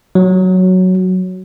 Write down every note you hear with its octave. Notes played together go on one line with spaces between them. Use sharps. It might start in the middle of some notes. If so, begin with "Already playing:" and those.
F#3